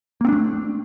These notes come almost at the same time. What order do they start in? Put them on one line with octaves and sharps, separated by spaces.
A#3 C4 D4 A3